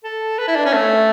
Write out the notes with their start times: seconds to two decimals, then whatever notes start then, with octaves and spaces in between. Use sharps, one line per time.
0.04 A4
0.38 B4
0.48 E4
0.56 D4
0.66 C#4
0.73 A3